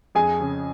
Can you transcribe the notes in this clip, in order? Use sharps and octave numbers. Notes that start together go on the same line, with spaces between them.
F2 G#4 G#5
C#3